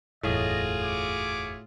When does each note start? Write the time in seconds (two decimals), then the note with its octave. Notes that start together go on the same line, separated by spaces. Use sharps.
0.23 F#1 E2 A2 F4 F#4 G#4 D5 D#5
0.82 C#5 E5 D6